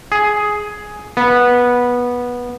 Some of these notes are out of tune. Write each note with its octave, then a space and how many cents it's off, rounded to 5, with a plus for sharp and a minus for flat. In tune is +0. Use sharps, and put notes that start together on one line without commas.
G#4 +5
B3 -15